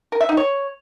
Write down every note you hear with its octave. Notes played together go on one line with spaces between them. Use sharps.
A#4
E5
D#4
C#5